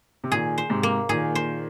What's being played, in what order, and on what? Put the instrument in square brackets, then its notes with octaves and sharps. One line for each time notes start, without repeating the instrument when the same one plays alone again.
[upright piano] C3
[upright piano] A#2 D#3 [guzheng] G#4
[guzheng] C5
[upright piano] G#2 C3
[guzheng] A#3
[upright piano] A#2 D#3 [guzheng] G#4
[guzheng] C5